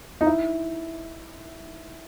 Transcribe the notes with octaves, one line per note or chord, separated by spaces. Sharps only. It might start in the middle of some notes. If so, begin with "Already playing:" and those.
D#4
E4